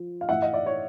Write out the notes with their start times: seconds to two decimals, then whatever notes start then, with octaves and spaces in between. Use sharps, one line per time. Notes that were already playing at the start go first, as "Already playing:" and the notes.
Already playing: F3
0.21 F5
0.29 A2 E3 E5 F#5
0.42 D#5 F5
0.54 D5 E5
0.66 C#5